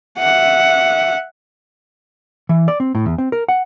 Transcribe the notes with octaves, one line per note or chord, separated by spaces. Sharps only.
E5 F#5
E3
D5
C4
A2
E2
C4
A#4
F#5